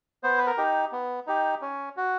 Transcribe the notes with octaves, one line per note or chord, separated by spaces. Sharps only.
B3 C5
B4
A#4
D#4 G4
B3
D#4 G4
C#4
F#4